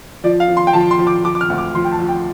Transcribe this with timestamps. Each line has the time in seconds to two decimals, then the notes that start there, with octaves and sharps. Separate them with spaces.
0.24 F3 D5
0.40 F5
0.48 F3
0.57 C6
0.67 G5
0.73 F3 A5
0.91 C6
0.99 F3
1.07 D6
1.24 F3 D6
1.35 D6
1.41 F6
1.50 D2
1.58 D6
1.75 F3 C6
1.85 G5
1.92 A5
1.99 F3
2.09 G5